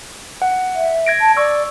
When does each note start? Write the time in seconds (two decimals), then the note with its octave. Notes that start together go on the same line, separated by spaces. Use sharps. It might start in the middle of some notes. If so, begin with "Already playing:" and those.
0.42 F#5
0.75 E5
1.07 G#6 A#6 D7
1.21 A5
1.37 D5 C#6 E6